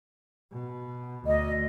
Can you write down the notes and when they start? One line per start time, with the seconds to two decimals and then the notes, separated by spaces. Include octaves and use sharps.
0.53 B2
1.26 D2 D#5